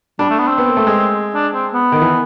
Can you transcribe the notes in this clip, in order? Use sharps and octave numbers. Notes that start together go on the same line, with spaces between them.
G3 D4
A3
B3
C4
B3
A#3
A3
G#3
D4
C4
B3
D#3
E3